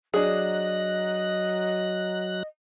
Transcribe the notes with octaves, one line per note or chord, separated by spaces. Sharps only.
F#3 D4 G#4 D#5 F#6